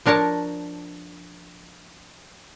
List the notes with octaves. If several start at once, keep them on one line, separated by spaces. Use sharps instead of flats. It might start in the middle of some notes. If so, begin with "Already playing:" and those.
F3 D4 A#4 C#5 A5